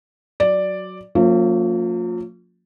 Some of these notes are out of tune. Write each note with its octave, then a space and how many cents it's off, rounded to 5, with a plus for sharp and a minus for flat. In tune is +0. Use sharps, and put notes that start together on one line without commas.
F#3 +0 D5 +0
F3 +30 A#3 -40 C#4 +0